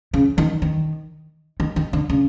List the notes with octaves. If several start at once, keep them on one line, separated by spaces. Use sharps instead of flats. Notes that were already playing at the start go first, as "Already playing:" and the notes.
C#3
D#3
D#3
D#3
D#3
D3
C#3